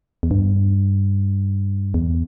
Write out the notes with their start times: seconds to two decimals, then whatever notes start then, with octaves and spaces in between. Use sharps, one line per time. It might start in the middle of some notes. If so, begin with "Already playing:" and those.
0.23 E2
0.31 G2
1.94 E2